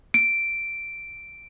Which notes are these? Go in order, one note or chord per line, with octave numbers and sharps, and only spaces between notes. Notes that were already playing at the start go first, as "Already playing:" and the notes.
D7